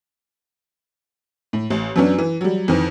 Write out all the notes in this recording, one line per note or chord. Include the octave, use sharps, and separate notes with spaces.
A2
A1
F#2 F#3 B3 C#4 D4
E3
F#3 G3
F2 D#3 E3